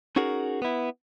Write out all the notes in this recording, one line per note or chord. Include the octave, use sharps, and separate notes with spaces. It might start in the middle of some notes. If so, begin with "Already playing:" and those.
C#4 D#4 F#4 G#4 A#4
B3 E4